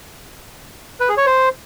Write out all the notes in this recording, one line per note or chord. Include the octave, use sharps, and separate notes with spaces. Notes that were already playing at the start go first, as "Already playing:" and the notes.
B4
G#4
C#5
C5